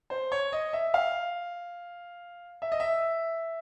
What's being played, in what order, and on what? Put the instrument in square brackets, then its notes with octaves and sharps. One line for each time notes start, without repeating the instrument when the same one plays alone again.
[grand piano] C5
C#5
D#5
E5
F5
E5
D#5
E5